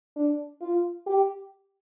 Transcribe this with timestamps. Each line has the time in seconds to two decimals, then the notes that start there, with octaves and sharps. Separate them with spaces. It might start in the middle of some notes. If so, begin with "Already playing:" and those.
0.16 D4
0.61 F4
1.07 G4